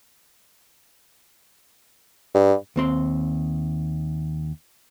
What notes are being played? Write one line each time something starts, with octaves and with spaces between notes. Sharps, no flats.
G2
D#2 C4 C6